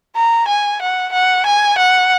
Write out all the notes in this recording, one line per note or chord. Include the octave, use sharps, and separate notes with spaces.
A#5
G#5
F#5
F#5
G#5
F#5